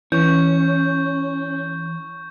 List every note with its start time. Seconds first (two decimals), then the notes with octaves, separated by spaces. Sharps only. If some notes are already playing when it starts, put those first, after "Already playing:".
0.12 E3 C#4 C#6 G6